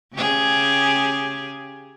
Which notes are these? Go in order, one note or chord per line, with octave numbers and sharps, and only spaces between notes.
C#3 G4 G#4